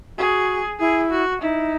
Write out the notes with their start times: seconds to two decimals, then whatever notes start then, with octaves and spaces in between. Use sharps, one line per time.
0.18 F#4 G#4
0.79 E4 G#4
1.11 F#4
1.42 D#4 E4